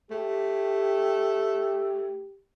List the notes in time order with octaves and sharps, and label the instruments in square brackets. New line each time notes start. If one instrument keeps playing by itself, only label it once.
[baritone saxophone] A3 [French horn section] G4